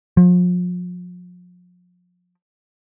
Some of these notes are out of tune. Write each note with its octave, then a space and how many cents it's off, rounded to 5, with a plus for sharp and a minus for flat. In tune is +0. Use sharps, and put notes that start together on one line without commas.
F3 +40